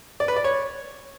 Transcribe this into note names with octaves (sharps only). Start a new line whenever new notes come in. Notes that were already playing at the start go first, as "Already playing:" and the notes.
D5
B4
D5
C#5